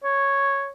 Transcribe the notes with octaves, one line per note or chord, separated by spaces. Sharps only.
C#5